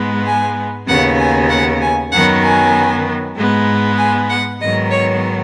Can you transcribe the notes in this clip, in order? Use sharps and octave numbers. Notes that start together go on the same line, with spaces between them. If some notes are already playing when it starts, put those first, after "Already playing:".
Already playing: G#2 G#3 B3
G#5
D#2 C#3 B3 F#5
G#5
F#5
G#5
F#2 D#3 F#3 B3 F#5
G#5
G#2 G#3 B3
G#5
F#5
G#2 D#3 F#3 B3 D#5
C#5